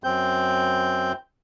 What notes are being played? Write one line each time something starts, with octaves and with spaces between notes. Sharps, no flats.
F#2 C4 G6